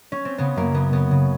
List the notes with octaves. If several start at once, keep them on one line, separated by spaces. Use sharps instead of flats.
C#4
C4
C#3 B3
F#2 A#3
C#3 B3
C#3 B3
C#3